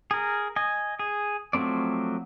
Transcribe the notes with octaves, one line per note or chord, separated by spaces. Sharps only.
G#4 A#4
D#5 G#5
G#4
F3 F#3 A3 C4 D5